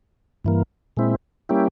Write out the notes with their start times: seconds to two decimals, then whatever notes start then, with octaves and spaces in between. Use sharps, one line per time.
0.45 G2 E3 A#3
0.97 A#2 G#3 C4 E4
1.49 G3 A#3 C#4 E4 G4